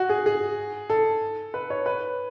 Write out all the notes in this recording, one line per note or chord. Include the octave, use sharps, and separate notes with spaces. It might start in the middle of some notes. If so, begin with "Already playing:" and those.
Already playing: F#4
G#4
G#4
A4
B4
C#5
B4